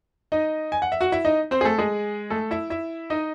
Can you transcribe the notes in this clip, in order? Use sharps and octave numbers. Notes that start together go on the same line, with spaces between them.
D#4 D#5
G#5
F#5
E5
F#4 F#5
E4 E5
D#4 D#5
C4 C5
G#4
A3 A4
G#3 G#4
A3 A4
E4 E5
E4 E5
D#4 D#5